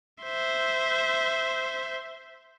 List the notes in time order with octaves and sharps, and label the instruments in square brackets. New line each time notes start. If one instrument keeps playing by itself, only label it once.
[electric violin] C5 E5